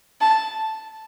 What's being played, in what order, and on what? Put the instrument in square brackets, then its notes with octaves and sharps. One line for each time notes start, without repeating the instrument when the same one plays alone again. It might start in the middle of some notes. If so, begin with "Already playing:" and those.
[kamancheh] A5